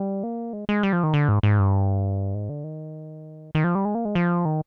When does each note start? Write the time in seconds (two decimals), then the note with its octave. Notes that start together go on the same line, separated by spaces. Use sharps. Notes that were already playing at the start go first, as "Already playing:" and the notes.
Already playing: G3
0.23 A#3
0.53 G#3
0.69 G#3
0.83 G3
0.93 F3
1.03 D#3
1.13 D3
1.29 G#2
1.43 G#2
1.59 G2
2.35 G#2
2.49 D3
2.64 D#3
3.55 D#3
3.64 F3
3.75 G3
3.85 G#3
3.95 A#3
4.05 G#3
4.15 F3
4.45 D#3